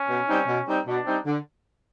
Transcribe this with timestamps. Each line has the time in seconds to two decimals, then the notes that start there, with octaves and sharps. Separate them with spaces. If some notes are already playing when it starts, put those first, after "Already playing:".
Already playing: C#4
0.08 B2
0.29 G3 C4 D#4
0.48 B2
0.67 G3 C4 D#4
0.86 B2 D4
1.06 G3 C4 D#4
1.25 D3